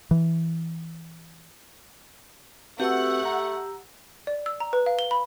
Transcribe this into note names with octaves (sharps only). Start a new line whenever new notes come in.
E3
A3 C4 F#4 G4 B4 F#5 E6
A#5
D5
E6
A#5
B4
F5
G7
B5